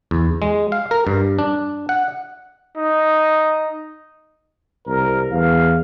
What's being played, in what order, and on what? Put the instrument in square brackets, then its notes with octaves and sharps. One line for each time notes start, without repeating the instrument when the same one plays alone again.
[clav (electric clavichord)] E2
G#3
F5
A#4
G2
D4
F#5
[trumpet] D#4
[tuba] C2 [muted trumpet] A#4
[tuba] E2 [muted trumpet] F5